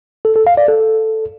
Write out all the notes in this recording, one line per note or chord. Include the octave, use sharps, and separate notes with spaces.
A4
A4
F5
D5
A4